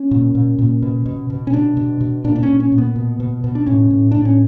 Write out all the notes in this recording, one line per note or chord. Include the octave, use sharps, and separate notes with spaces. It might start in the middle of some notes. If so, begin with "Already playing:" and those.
Already playing: C#4
A#2
A#2
A#2
B2
B2
B2
C#4
B2 D4
B2
B2
A#2 D4
D4
C#4
A#2
C#4
A#2
B3
B2
B2
B2
D4
A2 C#4
A2
A2 D4
C#4